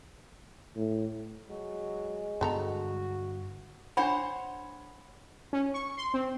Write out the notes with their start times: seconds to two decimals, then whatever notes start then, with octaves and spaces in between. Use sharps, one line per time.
0.76 A2
1.50 F#3 G#3
2.41 G2 D3 B3 F#4 A4 A#5
3.97 D4 C5 C#5 F#5 B5
5.53 C#4
5.74 C#6
5.97 C6
6.14 C4